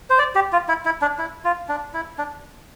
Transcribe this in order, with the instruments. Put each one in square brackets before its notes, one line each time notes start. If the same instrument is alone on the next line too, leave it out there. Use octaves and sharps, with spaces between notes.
[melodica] C5
D5
G4
F4
E4
E4
D4
E4
F4
D4
E4
D4